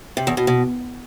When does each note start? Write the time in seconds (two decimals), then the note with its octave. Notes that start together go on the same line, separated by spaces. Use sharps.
0.17 C3
0.27 E2
0.37 B2
0.47 B2